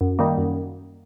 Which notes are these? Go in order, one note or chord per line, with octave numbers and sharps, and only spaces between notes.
F#2
D#3 G3 A#3
F#2